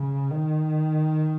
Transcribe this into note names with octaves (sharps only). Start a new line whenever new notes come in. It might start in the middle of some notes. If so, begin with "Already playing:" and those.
Already playing: C#3
D#3